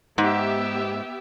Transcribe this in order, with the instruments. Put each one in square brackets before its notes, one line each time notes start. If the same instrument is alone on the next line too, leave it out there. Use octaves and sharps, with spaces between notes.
[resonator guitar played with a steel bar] G#2 [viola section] B3 G4 E5